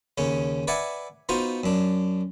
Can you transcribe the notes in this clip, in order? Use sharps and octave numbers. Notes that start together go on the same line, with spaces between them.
D#2 C#3 C#4
B4 D5 E5 F#5 G#5
B3 D#4 F4 F#4 C5
F#2 D4